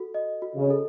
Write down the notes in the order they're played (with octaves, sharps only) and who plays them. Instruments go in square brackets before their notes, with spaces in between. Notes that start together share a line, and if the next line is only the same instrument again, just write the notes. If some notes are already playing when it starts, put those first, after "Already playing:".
Already playing: [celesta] F#4 A4
D#5
F#4
[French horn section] C#3
[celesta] A4